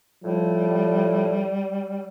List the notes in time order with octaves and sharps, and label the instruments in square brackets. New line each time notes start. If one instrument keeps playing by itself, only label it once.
[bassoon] A2 [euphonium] F3 [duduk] G3